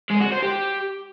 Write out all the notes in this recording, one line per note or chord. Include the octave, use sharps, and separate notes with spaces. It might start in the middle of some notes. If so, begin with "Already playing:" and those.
G#3
F#4
C5
G4